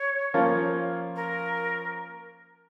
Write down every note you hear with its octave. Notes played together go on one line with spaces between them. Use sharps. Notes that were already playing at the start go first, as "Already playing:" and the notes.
Already playing: C#5
F3 A#3 C#4 F4
A#4